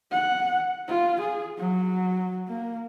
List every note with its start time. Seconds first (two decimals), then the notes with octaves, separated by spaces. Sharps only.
0.12 F#5
0.88 F4
1.21 G#4
1.58 F#3
2.48 A#3